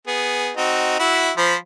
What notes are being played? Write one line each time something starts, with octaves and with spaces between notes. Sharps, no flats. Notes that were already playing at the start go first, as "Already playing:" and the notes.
B3 G#4
C4 D#4 F#4
E4 F#4 E5
F3 C5 B5